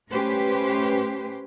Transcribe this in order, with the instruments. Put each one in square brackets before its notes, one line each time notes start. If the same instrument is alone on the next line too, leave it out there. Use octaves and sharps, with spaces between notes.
[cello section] A3 C#4 G4 B4 C5